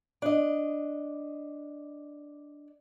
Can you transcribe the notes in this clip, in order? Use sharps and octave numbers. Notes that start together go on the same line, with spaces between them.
D4 D#5